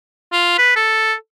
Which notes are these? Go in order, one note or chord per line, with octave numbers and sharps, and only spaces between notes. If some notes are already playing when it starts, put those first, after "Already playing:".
F4
B4
A4